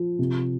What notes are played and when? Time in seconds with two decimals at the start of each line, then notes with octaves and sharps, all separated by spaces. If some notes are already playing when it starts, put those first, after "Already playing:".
Already playing: F3
0.19 C3